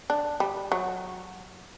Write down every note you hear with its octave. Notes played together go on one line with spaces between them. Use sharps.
D4
G3
F#3